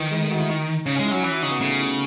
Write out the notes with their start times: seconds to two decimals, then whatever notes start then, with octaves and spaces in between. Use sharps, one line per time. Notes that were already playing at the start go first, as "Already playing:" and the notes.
Already playing: D#3 E3
0.11 G#3
0.22 A3
0.31 F#4
0.40 E4
0.50 D#4
0.86 C#3 C#4
0.96 C#4
0.99 G#3
1.04 E4
1.11 F#3 C#4
1.23 E3 E4
1.33 F#4
1.42 C#3 D#4
1.51 B3
1.61 C#3 A3
1.80 E4